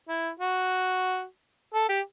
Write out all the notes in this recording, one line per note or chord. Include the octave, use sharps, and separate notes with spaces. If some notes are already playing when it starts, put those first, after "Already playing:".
E4
F#4
A4
G4